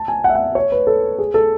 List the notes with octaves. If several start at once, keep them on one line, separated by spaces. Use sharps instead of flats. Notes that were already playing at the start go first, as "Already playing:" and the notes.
Already playing: A5
G#5
F#5
E5
F#5
C#5
B4
A4
G#4
A4